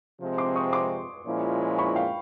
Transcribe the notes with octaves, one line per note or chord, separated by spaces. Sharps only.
C3 F3 G#3 C4
C6 D6
C#6 D#6
C6 D6
A#2 F3 G#3 C#4 E4
B5 C#6
F5 G5